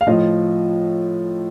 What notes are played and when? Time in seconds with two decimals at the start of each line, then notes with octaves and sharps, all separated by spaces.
0.01 F5
0.07 A2 F3 D#5